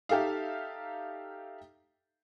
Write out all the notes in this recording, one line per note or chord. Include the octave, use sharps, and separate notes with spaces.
D#4 G4 A4 E5 F5